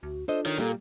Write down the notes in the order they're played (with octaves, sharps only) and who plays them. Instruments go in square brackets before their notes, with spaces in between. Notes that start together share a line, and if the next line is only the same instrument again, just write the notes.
[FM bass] D2 [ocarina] F#4
[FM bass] D4 [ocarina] F4 [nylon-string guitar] A4 C5 D#5
[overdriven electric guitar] D#3 [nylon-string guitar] C#5
[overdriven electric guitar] A#2 [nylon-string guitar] G3 A#3 [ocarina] A4